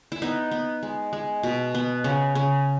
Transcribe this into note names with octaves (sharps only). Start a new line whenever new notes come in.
E4
B3 D#4
B3
G#3
G#3
B2
B3
C#3
C#3